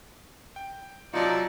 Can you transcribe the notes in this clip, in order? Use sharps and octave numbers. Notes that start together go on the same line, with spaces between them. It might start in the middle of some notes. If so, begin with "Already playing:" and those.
G5
C3 F#3 D#4 F4 D5 A5 C#7